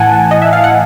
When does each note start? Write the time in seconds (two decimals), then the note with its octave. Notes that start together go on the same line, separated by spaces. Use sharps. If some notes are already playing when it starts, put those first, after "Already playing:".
Already playing: A2 E3 F#5 G#5 A5
0.31 D#5
0.42 E5
0.53 F5
0.64 F#5